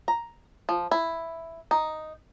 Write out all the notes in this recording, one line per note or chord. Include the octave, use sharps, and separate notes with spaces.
A#5
F3
E4
D#4